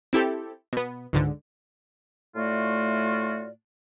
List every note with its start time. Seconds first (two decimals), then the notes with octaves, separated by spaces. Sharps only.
0.13 C4 E4 G4 A4
0.73 B2 B3
1.13 C#2 G#2 D3
2.36 A2 A3 F4 F#4 D5